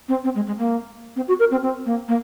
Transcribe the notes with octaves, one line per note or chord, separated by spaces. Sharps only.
C4
C4
G#3
G#3
A#3
C4
F#4
A#4
C4
C4
A#3
A#3